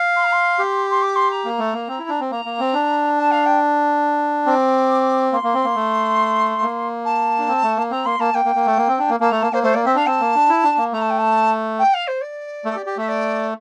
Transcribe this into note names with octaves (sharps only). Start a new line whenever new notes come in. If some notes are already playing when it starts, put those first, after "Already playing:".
Already playing: F5
C6
A#5
C6
G4
C6
D6
C6
A#5
A#3
A3
A#3
C4
E4
D4
C4
A#3 A#5
A#3
C4
D4
A5
F5
G5
C4 D6
A#3 C6
A#3
C4
A#3
A3
A#3
A5
D4
C4
A3
A#3
C4 A#5
A#3 C6
A#3 A5
A#3 G5
A#3
A#3
A3
A#3
C4
D4
A#3
A#3 A5
A3 A#5
A#3 A5
A#3 C5
A3 C5
A#3 D5
C4 E5
D4 F5
C4 A5
A#3
D4
E4
D4
A#3
A3 A#5
A5
G5
A5
G5
F5
C5
D5
A3
A4
G4
G4
A3 E5
D5